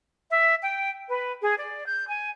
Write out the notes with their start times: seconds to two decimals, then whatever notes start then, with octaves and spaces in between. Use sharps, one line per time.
0.30 E5
0.62 G5
1.08 B4
1.41 G#4
1.58 D5
1.85 G6
2.08 G#5